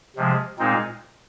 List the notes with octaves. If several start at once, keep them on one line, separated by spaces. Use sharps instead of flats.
C3 F3 G#3
A#2 G#3 C4 D#4